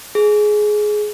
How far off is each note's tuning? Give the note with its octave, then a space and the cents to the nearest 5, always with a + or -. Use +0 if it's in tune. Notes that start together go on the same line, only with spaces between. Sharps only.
G#4 +15